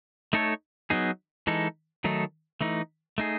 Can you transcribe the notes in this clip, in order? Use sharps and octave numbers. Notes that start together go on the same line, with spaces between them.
A3 D#4 A4 C#5
F#3 B3 D#4 G#4
E3 G#3 D#4 A4
D#3 F#3 A3 D#4 A4
E3 A3 D#4
A3 D#4 G#4